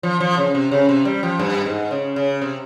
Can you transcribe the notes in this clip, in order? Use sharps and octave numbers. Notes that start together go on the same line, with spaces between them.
F3
F3
C#3
C3
C#3
C3
G3
F3
G2
G#2
C#3
C#3
C3